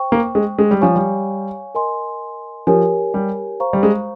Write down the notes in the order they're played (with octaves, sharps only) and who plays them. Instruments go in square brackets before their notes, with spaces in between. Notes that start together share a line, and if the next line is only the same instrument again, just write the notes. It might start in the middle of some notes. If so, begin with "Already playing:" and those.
Already playing: [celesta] C5 G5 C#6
[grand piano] A#3
G#3
G#3
G3
[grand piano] F3 [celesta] C#5 F5 G#5 C#6
[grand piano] G3
[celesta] A#4 D#5 G#5 C6
[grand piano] F3 [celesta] G4 A#4 C#5 G#5
[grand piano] G3
[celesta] C5 F5 A#5 C#6
[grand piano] G3
G#3